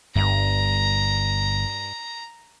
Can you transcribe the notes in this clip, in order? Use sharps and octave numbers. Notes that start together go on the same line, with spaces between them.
G1 G2 A#5